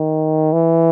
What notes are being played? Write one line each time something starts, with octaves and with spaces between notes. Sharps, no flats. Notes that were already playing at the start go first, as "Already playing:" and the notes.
Already playing: D#3
E3